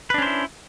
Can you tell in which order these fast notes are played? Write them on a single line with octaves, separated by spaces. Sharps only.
B4 D4 C#4 C5 E4